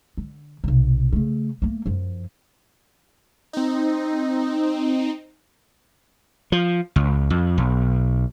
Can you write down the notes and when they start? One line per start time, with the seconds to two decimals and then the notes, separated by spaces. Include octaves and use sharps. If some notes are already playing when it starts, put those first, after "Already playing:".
0.17 D3
0.64 B1 C3
1.13 C#3 A3
1.62 A3 A#3
1.86 F#2 F3
3.53 C4 D#4
6.52 F3
6.96 C#2
7.30 F2
7.58 B1